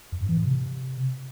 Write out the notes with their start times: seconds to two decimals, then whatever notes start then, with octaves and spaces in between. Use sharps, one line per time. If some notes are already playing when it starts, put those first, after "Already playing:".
0.12 F2
0.21 G2
0.29 E3
0.37 A2
0.45 C3